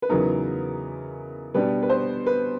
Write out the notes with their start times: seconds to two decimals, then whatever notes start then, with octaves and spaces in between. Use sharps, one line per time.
0.02 B4
0.09 E2 C#3 F#3 B3 D#4 A#4
1.54 B2 G3 B3 D4 B4
1.83 B4
1.89 C5
2.26 B4